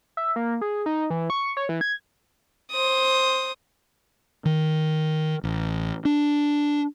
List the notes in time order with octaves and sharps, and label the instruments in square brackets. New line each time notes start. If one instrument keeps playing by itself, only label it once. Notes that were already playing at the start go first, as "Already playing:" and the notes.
[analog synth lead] E5
A#3
G#4
D#4
E3
C#6
C#5
E3
G#6
[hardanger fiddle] C5 D#6
[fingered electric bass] D#3
A1
D4